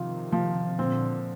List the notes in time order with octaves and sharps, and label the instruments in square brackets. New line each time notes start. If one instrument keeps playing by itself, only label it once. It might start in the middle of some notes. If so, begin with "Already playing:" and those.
Already playing: [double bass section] C3 D#3 [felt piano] F3 F4
[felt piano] F3
[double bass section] A#2 D3 [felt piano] C4